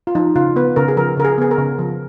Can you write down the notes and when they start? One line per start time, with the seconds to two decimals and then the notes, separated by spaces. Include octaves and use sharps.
0.07 F4
0.15 F3 D#4
0.36 C#3 F4
0.56 B3 B4
0.76 C#3 A#4
0.88 G#4
0.97 F3 A#4
1.17 C#3 A#4
1.25 G#4
1.38 B3 G#4
1.51 A#4
1.58 C#3
1.79 F3